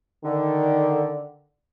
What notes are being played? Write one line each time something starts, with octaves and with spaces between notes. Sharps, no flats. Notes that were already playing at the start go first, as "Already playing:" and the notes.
D3 D#3